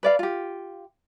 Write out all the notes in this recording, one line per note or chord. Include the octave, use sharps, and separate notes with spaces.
B4 D5 F5
F4 G4